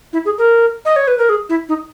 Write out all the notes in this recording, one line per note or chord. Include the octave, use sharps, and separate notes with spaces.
E4
G#4
A#4
D#5
C#5
B4
A#4
G#4
E4
D#4